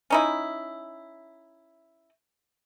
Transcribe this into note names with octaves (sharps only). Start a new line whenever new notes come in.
C#4 D#4 E4